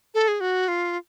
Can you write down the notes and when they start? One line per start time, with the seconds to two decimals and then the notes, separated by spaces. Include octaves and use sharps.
0.14 A4
0.28 G#4
0.40 F#4
0.68 F4